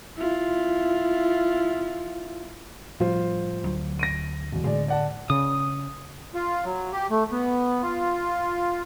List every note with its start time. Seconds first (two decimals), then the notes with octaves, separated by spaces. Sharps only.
0.17 E4 F4
3.00 A2 F3 G3 F4 C5
3.64 D2 F#3
3.99 A#6 D7 D#7
4.52 E1
4.64 A2 D3 G#3 D5
4.88 D5 F#5 A5
5.30 C#3 D#6
6.34 F4
6.65 F#3
6.93 G4
7.11 A3
7.32 B3
7.82 F4